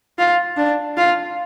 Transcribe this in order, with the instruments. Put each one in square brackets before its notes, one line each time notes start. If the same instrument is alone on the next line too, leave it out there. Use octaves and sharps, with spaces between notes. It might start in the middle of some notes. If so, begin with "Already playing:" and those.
[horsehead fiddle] F4
D4
F4